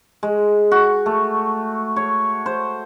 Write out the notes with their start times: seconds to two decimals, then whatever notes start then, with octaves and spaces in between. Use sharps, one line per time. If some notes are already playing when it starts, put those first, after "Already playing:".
0.23 G#3
0.71 F#4
1.06 A3
1.96 C#5
2.46 C5